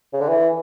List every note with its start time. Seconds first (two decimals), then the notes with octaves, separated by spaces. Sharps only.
0.13 C#3
0.21 D3
0.29 E3